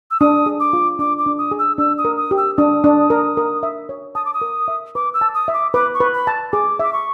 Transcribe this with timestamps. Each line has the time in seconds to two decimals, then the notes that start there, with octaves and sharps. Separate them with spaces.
0.11 E6
0.20 D4 D#6
0.46 G#4
0.60 D6
0.73 F4
0.99 D4 D6
1.19 D6
1.26 D4
1.38 D#6
1.51 G#4
1.59 E6
1.78 D4 E6
1.98 D#6
2.05 A#4
2.17 D#6
2.31 G4
2.37 E6
2.57 D4 D#6
2.84 D4
3.10 A#4
3.37 A#4
3.63 E5
3.89 C#5
4.15 A5 D#6
4.25 D6
4.34 D#6
4.41 A#4
4.68 E5
4.95 B4 D6
5.14 E6
5.21 A5
5.35 D#6
5.48 E5
5.54 D6
5.73 B4 D6
5.94 C#6
6.00 B4
6.14 B5
6.27 A5
6.53 G#4 D6
6.79 E5 D6
6.93 C#6